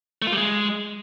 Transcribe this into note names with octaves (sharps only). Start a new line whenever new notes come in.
A3
F4
G3
G#3